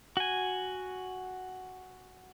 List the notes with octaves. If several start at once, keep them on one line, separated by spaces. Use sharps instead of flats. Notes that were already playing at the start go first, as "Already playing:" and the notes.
F#4 G#5